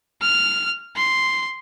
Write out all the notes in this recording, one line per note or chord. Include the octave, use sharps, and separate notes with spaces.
F6
C6